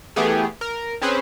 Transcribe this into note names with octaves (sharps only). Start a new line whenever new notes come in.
E3 A3 B3 G4 G#4
A#4
C4 C#4 G#4 B4 C5